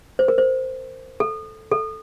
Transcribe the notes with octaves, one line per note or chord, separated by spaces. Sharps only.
C5
A#4
C5
A4
A4